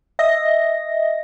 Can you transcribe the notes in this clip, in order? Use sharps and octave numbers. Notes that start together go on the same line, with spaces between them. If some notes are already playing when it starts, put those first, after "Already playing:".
D#5 E5 A#6